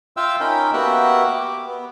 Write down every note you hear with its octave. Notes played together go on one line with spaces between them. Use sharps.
F4 E5 F5 G5 E6
C#4 D#4 A#4 G5 B5
A#3 B3 F#4 G4 E5 F#5
D6
B3